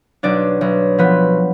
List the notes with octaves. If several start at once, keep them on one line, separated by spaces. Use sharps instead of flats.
B1 D4 D5
B1
F3 B3 B4